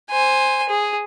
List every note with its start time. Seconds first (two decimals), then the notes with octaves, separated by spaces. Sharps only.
0.10 C5 G#5
0.69 G#4